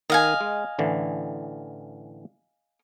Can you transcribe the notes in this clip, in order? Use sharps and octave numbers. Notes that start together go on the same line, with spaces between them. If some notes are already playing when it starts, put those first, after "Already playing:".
D#3 D#5 F5 G#5
G#3
A1 D3 E3